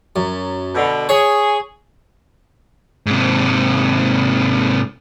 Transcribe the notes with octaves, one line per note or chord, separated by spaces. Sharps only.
F#2
B2 D3
G#4 C#5
G#2 C3